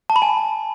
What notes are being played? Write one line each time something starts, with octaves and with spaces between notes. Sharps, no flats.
A5
B5
G#5